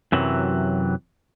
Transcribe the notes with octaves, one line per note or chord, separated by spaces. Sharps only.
F#2 C3 E3 F#3